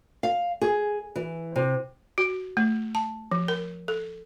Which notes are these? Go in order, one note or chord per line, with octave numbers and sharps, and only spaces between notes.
F5
G#4
E3
C3
F#4
A3
A5
F3
A#4
A4